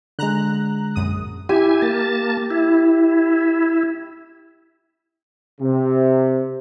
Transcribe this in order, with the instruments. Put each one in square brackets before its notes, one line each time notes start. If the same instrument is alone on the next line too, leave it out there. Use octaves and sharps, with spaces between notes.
[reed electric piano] D3 G#3 [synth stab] A#5 F#6
[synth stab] A#1 F#2 D#6
[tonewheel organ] E4 G#5 [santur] G4
[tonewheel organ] A#3 A5
E4
[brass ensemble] C3